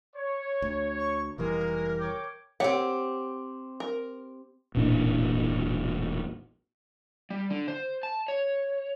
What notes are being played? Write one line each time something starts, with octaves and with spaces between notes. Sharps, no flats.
C#5
D2
C#6
F1 E3 G3 G#3 A#3 A#4
C#5 G5 D6
C4 G4 A#4 C#5 F#5
A#4
E1 A1 A#2 D4
G3
D3
C5
A5
C#5